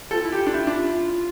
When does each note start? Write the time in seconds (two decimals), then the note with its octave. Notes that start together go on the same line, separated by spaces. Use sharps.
0.11 F4 A4
0.21 E4
0.32 F4 G4
0.46 D4
0.54 E4
0.67 D4